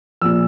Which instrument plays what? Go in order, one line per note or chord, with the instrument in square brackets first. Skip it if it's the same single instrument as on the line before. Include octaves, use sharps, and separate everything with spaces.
[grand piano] A#1 A#2 E6